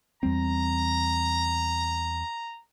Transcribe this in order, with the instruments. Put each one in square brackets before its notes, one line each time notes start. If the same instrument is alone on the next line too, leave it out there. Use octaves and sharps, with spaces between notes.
[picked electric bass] E2 G3 C4 [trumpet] A#5